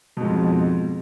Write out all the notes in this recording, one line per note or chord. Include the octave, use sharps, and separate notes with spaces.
F2 G#2 B2